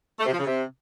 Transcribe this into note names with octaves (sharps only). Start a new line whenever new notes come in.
A3
C3
F3
C#3
C3